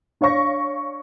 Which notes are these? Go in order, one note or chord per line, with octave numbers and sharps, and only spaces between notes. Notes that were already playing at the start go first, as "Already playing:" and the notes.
D4 C#5 F5 C#6 A#6